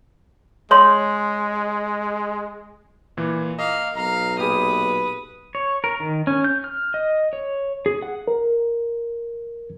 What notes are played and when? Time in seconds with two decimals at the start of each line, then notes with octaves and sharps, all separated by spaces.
0.71 G#3 C#5 C6
3.17 A#2 E3
3.59 A#3 D#5 F5
3.96 B1 F5 A#5
4.39 A#2 G4 G#4 B4 D#6
5.55 C#5
5.84 A#4
6.00 D#3
6.27 C#4
6.44 G6
6.64 F6
6.94 D#5
7.33 C#5
7.86 G#4
8.02 F#5
8.28 A#4